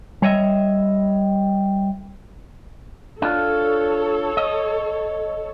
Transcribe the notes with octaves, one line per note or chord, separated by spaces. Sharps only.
G3 C#5 D#5 E5
D4 F4 A4 C#5
D#5